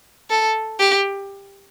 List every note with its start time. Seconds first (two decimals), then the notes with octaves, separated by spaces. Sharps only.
0.30 A4
0.80 G4